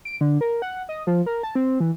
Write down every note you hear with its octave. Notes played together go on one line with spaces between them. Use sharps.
D7
D3
A#4
F#5
D#5
F3
A#4
A5
C4
E3